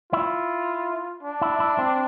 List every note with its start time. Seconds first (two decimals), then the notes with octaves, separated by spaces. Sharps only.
0.13 E4 F4
1.23 D4
1.41 E4
1.60 E4
1.78 C4